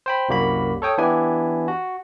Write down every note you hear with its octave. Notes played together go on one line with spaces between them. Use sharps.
C5 G5 B5
C2 F#2 G3 A#3 F#4 B5
A4 C#5 G5 D#6
E3 B3 D4 E4 G4 G#5
F#4